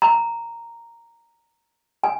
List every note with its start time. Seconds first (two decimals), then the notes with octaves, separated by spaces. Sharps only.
0.02 A#5
2.04 G#5